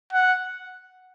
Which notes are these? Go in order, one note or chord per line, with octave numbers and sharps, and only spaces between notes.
F#5